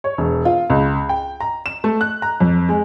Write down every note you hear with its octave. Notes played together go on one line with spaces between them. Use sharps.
C#5
E1
F4
C#2
G5
A#5
E7
A3
F#6
A#5
F2
G#3